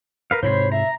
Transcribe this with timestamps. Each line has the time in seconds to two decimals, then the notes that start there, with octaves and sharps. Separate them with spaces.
0.31 A#4 B4 F5
0.43 G#2 C3 C5 C#5 B5 C6
0.72 E5 A#5